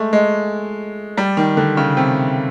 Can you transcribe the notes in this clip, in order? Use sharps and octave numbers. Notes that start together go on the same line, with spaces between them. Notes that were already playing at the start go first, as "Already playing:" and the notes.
Already playing: G#3 A3
G#3
G3
D#3
D3
C#3
C3